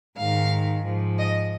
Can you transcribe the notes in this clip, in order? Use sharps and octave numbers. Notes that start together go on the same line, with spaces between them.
G#2 D#3 F5
G#2 F3
D#5